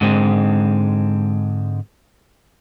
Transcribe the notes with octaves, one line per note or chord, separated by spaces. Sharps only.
G#2 D3 G#3 C4